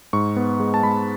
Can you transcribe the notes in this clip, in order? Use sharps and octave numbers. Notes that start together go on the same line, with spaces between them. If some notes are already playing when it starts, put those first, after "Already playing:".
G#2 C#6
B3
G#3
A5
G#3 B5